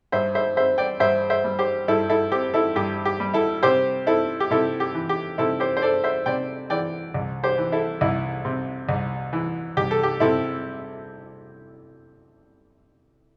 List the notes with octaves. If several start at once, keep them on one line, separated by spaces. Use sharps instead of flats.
G2 C5 E5
C5 E5
C4 C5 E5
D5 G5
G2 C5 E5
C5 E5
G3
G4 C5
G2 E4 A4
E4 A4
C4 G4
E4 A4
G2 G4
G4
G3
E4 A4
C3 G4 C5
C4 E4 A4
G4
C3 E4 A4
G4
E3
G4
C3 E4 A4
G4 C5
C5
C4 A4 D5
C5 E5
C3 D5 G5
E3 D5 G5
C2
G4 C5
E3
E4 A4
C2 E4
C3
C2
E3
C2 G4
A4
G4
C3 E4 A4